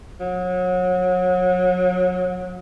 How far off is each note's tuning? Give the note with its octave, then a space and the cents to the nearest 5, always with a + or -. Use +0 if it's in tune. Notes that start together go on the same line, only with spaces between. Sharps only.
F#3 -30